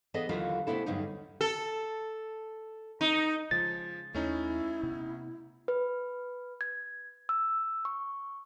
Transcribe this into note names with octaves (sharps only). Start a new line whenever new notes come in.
E3 B3 G#4 A4 D#5
D#2 D3 E3 F#3 F4 A4
C3 A3 B3 D4 E4 A4
E2 G2 D3 F#3 C#4 D#4
A4
D#4
C#3 F3 G#3 A6
D#2 A3 C#4 D#4 E4
C3 B3
B4
G#6
E6
C#6